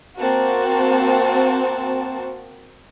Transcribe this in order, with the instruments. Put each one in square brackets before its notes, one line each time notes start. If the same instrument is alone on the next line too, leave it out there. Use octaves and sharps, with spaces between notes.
[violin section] A#3 C4 F#4 A5